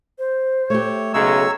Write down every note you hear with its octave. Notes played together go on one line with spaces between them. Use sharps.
C5
A3 G4 C#5
B1 C#3 G#3 C#5 A#5 E6